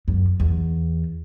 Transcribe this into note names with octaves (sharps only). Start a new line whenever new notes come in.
F#2
E2